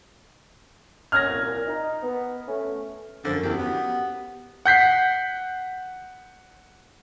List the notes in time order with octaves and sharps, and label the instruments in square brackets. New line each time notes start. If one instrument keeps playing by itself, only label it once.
[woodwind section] F#2 F#3 C#4 [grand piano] F6 G#6 A#6
[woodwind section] C2 A#2
D#4
B3
A3 C#4
[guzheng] F#2 F3 [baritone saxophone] D3
[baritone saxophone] E2 [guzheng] G4
[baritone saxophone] B3
[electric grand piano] F#5 G6 B6 C7